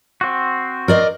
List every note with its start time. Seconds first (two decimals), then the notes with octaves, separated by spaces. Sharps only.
0.21 C4 F#4
0.88 A#4 D5 D#5